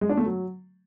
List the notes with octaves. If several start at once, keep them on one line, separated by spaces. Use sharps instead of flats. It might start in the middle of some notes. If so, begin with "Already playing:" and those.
G#3
D4
A3
F#3